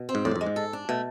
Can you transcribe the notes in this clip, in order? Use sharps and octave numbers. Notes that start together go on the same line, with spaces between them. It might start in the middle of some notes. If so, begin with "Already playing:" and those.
Already playing: B2
C4
G#2
F2 A2 D5
G#2
F2
G#3
G#2
A4
D4
B2 A3